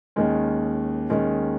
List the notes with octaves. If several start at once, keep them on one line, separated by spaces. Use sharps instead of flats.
D#2 D#3 G#3 C#4
D#2 D#3 G#3 C#4